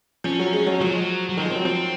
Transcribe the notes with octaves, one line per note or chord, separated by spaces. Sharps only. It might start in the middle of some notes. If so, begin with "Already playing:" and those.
F3 C#4
F#3
G#3
F#3
F3 F#3
G#3
F#3
F#3
D#3 G#3
F3
F#3 C4
F3 C4